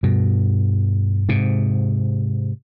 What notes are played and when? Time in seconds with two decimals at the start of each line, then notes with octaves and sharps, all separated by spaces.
0.03 G2 B2
1.29 G#2 C3